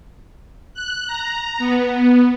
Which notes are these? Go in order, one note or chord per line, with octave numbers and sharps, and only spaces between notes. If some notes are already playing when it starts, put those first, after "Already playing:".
F#6
A#5
B3